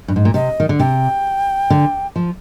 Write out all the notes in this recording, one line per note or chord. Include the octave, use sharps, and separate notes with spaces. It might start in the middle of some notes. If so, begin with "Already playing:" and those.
G2
G#2
A#2
C3 D#5
D#3
D3
C3 G5
D3
F3